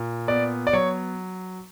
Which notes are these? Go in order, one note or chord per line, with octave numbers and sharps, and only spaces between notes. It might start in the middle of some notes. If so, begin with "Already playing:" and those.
Already playing: A#2
B3 D5
D5
F#3 C#5